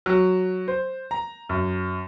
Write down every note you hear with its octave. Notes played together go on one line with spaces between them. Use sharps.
F#3
C5
A#5
F#2